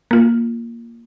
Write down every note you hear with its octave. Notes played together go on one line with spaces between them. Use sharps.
A#3 F4